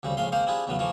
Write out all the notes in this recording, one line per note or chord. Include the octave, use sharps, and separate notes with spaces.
D2 C#3 G3 C4
A#1 A2 C#3 G#3 F5 C6
G#3 A#3 C4 C5 F5
C4 D4 E4 F4 G4 G#4
E2 A2 C#3 F#3 B3 C#4
E3 F3 A3 A#3 F4